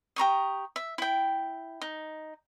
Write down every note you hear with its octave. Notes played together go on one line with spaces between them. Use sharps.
G4 A#5 C#6 D#6
E5
E4 G5
D#4